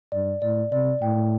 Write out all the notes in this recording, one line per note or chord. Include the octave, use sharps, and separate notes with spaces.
G2 D5
A2 D5
C3 D5
A2 G5